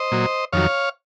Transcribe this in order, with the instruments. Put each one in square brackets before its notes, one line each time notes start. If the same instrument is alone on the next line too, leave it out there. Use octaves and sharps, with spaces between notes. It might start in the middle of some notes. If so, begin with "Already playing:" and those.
Already playing: [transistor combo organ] C5 D#5
A#2 F#3
F2 D#3 F#3 C#5 F5